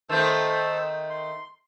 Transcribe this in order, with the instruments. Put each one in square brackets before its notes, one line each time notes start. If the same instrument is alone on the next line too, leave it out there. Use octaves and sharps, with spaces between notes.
[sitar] D#3 A3 C4 [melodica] A4 C5 A5
[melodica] C6